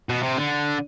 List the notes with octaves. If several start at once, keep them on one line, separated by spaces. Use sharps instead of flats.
B2
C3
D3